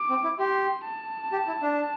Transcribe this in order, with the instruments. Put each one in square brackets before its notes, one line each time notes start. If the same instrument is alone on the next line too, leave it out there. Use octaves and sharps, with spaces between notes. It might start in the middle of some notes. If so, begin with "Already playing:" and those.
Already playing: [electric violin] D6
[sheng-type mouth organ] C4
E4
[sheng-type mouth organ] G4 [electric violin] C6
[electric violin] A5
[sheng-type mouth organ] G4
E4
D4